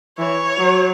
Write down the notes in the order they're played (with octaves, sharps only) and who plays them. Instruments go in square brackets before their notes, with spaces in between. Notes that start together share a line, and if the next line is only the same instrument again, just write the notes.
[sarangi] E3 [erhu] C#5
[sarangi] F#3